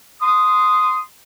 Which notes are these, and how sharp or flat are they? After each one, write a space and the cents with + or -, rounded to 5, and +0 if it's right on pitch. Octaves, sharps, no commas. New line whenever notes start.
C6 -15 D#6 +0